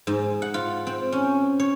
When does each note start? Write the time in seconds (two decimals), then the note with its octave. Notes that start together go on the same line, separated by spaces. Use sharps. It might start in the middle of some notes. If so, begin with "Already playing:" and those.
0.07 G#2
0.42 F#5
0.54 F4
0.87 C4
1.12 C#4
1.60 C#5